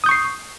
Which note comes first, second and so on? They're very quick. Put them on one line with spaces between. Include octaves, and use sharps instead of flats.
D#6 G6 C#6 C7